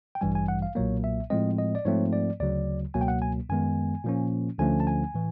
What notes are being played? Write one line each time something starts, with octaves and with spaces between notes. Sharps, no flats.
G5
A1 G2 E3 G3 G#5
G#5
F#5
F5
B1 A#2 F#3 A#3 C#5
E5
A2 F3 G#3 C4 D#5
D#5
D5
G#2 F3 A3 C4 C#5
D5
D2 C#3 F#3 D5
C#2 B2 F#3 A#3 G#5
G5
F#5
G#5
F#2 D#3 G#3 B3 G#5
A#2 F3 A#3 C#4
D2 D3 F3 A3 C#4 G#5
A5
G#5
A2 E3